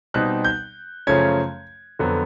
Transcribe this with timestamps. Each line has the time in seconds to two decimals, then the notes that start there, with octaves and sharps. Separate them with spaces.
0.14 B2 G3 C4 D#4 F#6
0.44 G6
1.07 F#2 C#3 F3 A3 C#4 G#6
1.99 F2 D3 F#3 B3